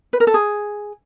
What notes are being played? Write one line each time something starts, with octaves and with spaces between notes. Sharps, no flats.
B4
A#4
A4
G#4